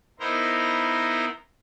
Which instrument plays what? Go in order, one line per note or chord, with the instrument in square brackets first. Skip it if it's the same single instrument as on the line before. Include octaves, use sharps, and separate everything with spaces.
[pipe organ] B3 D#4 E4 A#4 C5 A#5